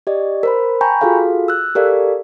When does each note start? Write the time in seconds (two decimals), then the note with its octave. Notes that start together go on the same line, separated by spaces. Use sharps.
0.07 G4 D5 D#5
0.43 A#4 C5 B5
0.81 G5 G#5 A#5 B5 C#6 G6
1.01 F4 F#4 G#4 A4 F5
1.48 E6 F#6
1.75 G4 A4 A#4 D5 F5